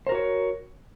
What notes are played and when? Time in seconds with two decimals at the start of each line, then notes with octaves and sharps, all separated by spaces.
0.07 C5
0.09 A#4
0.12 F#4
0.15 C#5